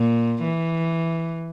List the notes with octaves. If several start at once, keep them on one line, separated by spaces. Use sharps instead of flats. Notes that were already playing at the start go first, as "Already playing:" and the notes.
Already playing: A#2
E3